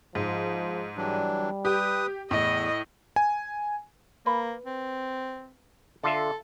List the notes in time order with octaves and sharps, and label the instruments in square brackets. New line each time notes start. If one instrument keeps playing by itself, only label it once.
[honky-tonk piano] G#2 [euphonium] F3
[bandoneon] E3 F#3 D4 [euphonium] G3
[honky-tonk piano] G4 [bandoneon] B4 D#6
[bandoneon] E2 [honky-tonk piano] A2 [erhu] D#5
[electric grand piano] G#5
[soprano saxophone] A#3 [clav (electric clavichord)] B4
[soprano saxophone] C4
[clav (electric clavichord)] D3 F4 E5 [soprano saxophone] A4